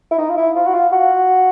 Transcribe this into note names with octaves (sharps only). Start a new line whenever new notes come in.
E4
D#4
F4
E4
F4
F#4
F4
F#4